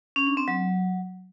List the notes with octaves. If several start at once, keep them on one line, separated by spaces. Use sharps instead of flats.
C#4
D4
C4
F#3